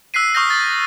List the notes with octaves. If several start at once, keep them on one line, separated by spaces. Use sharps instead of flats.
E6 F#6 B6 C7 D#7
C#6 D#6 F6 G6 A#6
A6